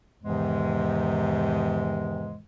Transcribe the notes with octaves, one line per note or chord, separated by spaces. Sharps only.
E2 G#2 C3 D#3 E3 G#3